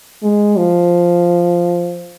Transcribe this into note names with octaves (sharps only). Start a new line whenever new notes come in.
G#3
F3